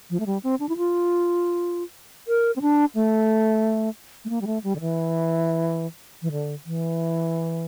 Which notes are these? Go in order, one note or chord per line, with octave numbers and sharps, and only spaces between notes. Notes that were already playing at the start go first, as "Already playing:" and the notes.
F3
A3
G3
C4
D4
E4
F4
A#4
C4
D4
A3
A3
A#3
G3
A3
G3
D3
E3
E3
D3
E3